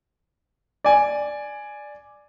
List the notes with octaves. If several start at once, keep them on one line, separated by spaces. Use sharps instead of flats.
D5 G#5